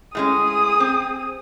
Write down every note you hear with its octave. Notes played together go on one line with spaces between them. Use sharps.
A2 G#3 C#4 G#4 D#6
C4